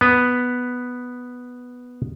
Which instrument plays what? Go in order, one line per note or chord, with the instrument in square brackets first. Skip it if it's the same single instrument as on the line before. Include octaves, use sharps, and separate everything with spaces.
[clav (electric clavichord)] B3 B4